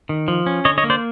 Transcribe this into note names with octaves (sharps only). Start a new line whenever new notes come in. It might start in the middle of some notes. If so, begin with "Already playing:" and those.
D#3
F3
C#4
D3 C#5 D#5
C#5 D#5
A#3
C5 D5